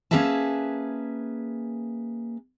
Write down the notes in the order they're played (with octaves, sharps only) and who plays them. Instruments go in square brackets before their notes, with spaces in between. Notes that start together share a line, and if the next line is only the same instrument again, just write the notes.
[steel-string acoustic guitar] A#3 C#4 G#4 B4 E5 A5